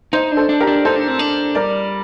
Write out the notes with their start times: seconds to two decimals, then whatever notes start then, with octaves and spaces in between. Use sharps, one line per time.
0.13 D#4 C5 D#5
0.32 D4
0.37 A4 C5
0.49 D4
0.60 G4 A#4
0.67 D4
0.85 D#4 A4 C5
0.96 D4
1.08 C4
1.19 D4
1.55 G3 A#4 D5